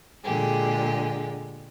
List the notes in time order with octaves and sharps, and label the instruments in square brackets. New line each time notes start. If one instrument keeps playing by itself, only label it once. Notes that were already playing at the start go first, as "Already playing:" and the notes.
[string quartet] A#2 D3 G#3 G4 G#4